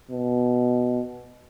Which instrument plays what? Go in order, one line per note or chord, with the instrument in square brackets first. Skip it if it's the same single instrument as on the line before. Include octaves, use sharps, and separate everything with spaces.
[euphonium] B2